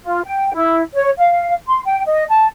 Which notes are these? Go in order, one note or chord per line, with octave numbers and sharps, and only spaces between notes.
F4
G5
E4
C#5
F5
C6
G5
D#5
A5